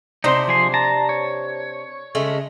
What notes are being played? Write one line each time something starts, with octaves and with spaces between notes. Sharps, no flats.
C3 D4 D#4 C5 C6
F3 G#4 C6
A5 A#5
C#5
C#3 G#3 A3